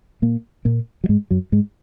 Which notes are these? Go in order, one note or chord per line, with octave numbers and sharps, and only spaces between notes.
A#2 A#3
A#2 A#3
F#3
G#2 G#3
F#2 F#3
G#2 G#3